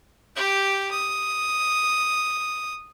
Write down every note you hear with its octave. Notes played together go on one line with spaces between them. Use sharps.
G4 G5
D#6